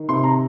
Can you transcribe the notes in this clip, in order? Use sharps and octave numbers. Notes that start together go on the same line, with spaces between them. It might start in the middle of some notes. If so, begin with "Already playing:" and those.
Already playing: D#3
C3 C6
A#5